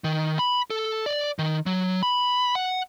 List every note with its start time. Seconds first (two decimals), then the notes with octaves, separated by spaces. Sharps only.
0.04 D#3
0.39 B5
0.70 A4
1.06 D5
1.39 D#3
1.66 F#3
2.03 B5
2.55 F#5